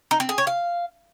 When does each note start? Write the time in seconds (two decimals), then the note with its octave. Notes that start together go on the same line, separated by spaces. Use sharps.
0.11 D#4
0.20 C4
0.29 G#4
0.38 C#5
0.47 F5